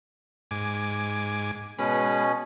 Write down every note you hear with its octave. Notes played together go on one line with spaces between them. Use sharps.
G#2 G#5 D6
B2 G#3 C#4 B4